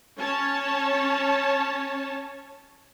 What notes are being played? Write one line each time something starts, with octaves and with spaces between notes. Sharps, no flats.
C#4 C#5 A5